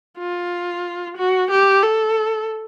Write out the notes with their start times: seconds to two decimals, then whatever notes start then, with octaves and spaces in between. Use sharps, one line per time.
0.19 F4
1.17 F#4
1.51 G4
1.83 A4